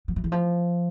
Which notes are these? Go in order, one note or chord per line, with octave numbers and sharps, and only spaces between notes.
F#3
F3
E3
F3